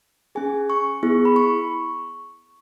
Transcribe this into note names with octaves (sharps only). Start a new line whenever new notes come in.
C#4 G#4 G#5
C#6
B3 E4 G#4 C#6
B5
C#6